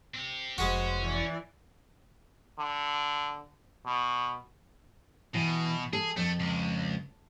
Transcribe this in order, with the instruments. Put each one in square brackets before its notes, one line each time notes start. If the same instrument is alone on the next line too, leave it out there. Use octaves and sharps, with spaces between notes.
[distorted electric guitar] C4 G4
[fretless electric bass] F1 [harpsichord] G#3 F#4 [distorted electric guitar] C#4 [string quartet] B4 C5
[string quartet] E3 D5
[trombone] D3
B2
[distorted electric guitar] B2 [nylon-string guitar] E3
[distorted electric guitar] G#4 [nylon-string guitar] A4
[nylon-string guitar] F2 [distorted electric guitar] A3
[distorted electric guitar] C#2